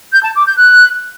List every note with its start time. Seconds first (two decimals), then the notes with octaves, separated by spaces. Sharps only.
0.13 G6
0.24 A5
0.35 D6
0.46 G6
0.57 F#6